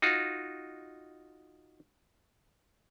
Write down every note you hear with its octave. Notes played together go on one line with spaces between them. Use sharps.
D#4 F4 F#4